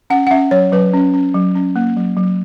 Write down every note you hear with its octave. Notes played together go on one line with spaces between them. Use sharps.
C#4 F#5
F#5
C#4 E5
F#3 C#5
F#3 B4
C#4
C#4
F#3
C#4
A#3
F#3
F#3